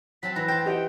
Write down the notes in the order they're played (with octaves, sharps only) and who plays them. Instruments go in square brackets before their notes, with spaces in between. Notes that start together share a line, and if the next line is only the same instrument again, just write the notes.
[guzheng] F#3 C4 A5 [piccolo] B6
[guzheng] E3 B4 [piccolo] A#6
[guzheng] C5 A5 [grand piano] G5
[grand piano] G4 D#5 F#5 [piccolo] G5